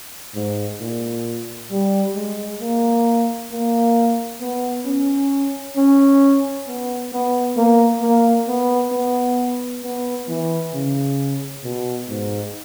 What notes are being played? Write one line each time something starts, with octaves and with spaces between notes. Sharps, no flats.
G#2
A#2
G3
G#3
A#3
A#3
B3
C#4
C#4
B3
B3
A#3
A#3
B3
B3
B3
E3
C#3
B2
G#2